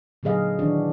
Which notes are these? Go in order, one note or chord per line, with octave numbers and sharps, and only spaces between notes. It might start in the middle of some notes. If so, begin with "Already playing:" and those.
A#2 D3 F#3 G#4 D#5 F5
D#3 E3 D4 F#4